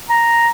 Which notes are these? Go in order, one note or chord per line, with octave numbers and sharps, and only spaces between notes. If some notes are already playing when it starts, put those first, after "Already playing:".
A#5